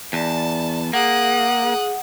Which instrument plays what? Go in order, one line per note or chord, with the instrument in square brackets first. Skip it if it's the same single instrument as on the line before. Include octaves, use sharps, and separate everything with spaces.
[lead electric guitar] E2 [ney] D5 [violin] A5
[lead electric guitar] A#3 [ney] G#4 [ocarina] F#5 [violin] D#6 F#6
[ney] G#4